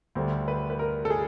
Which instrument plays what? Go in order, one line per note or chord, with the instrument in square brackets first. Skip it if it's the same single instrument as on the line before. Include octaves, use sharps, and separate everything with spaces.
[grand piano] D2 D3 G3 [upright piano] C5
[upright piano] B4
B4
A#4
A4
G#4